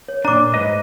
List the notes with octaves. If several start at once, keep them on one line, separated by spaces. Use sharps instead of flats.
C#5
A#2 D4 A#5 D6
G#2 B4 D#5